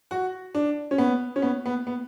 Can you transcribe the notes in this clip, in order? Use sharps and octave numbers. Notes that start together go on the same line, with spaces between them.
F#4
D4
C#4
B3
C#4
B3
B3
B3